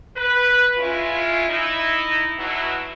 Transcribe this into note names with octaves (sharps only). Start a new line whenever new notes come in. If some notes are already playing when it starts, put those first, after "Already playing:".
B4
G#3 C#4 E4 F4
D#4 E4
B2 F#3 E4